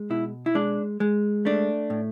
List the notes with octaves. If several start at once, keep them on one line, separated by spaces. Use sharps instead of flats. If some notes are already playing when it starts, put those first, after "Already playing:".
Already playing: G#3
B2 E4
E4
G#3 D4
G#3
A3 D4
A2